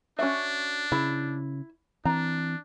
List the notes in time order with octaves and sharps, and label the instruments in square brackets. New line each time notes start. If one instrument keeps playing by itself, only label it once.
[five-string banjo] C#4 F#4 E5 [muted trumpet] D4
[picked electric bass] C#3 [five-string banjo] E4
[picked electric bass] E3 C4 [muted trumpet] D4 [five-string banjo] A#5